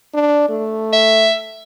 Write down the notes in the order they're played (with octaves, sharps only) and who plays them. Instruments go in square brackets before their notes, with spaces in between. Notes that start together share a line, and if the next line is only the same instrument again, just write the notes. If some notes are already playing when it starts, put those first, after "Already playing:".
[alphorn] D4
A3
[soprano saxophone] E5